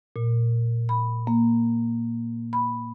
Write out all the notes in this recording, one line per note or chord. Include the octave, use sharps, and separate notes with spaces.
A#2
B5
A#3
B5